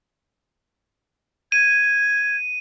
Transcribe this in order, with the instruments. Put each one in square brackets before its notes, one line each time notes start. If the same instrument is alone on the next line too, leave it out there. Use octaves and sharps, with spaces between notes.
[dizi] G#6 [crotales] D#7